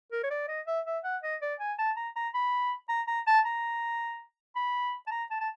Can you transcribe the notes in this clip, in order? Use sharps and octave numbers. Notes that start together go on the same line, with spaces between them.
A#4
C#5
D5
D#5
E5
E5
F#5
D#5
D5
G#5
A5
A#5
A#5
B5
A#5
A#5
A5
A#5
B5
A5
A#5
A5
A5